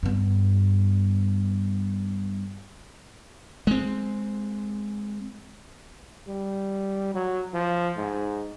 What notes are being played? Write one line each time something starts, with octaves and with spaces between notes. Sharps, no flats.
G2 B3
G#3 C4
G3
F#3
F3
G#2